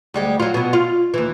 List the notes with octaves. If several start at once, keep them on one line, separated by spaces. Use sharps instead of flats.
D2 G3 G#3
F#3 F4
B2 F#3
F4
D#2 E3